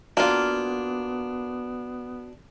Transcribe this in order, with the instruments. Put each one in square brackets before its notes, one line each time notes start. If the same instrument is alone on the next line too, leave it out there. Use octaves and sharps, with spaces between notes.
[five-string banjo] A#3 F4 [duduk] B3 [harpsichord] D4 [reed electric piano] F#4